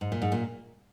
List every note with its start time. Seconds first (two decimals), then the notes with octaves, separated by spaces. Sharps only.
0.01 G#2
0.12 A#2
0.22 G#2
0.32 A#2